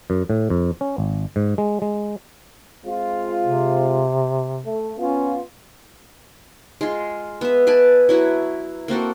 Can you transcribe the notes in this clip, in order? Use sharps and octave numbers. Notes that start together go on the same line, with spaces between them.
F#2
A2
F2
C#4
G#1
G#2
G#3
G#3
G#3 C4 F4
C3
A3
B3 C#4 F4
G#3 F4
B3 E5
B4 D5 G#5 A5
F#3 E4 F#4
A#3 C4 F#4 A4